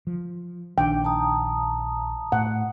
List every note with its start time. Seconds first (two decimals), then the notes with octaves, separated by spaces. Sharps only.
0.07 F3
0.78 A#1 D#3 D4 G5
1.04 A5 A#5 D#6
2.32 A2 F#5